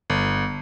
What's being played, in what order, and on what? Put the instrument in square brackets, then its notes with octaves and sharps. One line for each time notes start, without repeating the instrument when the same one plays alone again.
[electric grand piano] G1